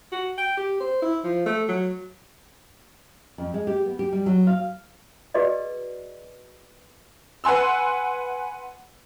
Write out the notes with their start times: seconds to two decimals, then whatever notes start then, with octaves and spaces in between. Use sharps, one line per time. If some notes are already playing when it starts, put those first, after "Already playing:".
0.12 F#4
0.38 G5
0.57 G4
0.80 C5
1.02 E4
1.24 F3
1.46 A3
1.68 F#3
3.38 F2
3.54 G#3
3.67 G4
3.86 B3
3.99 G4
4.12 G3
4.26 F#3
4.47 F5
5.34 F#4 G#4 B4 D5 D#5
7.44 B4 F#5 G#5 C6 E6